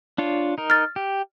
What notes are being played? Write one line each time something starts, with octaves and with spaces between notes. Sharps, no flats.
D4 F4 C#5
D#4 A#4
F6 A6
G4